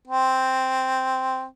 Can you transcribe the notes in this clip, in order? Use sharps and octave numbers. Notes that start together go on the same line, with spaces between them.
C4